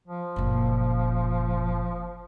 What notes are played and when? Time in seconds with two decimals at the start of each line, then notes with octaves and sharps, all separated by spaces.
0.08 F3
0.36 F#1 A#2